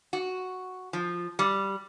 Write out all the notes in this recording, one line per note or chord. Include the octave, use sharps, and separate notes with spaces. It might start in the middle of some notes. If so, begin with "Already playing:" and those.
F#4
F3
G3